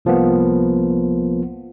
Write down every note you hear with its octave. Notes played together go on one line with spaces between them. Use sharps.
C2 F3 A#3 B3